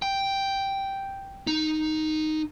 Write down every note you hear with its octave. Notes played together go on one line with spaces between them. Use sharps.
G5
D#4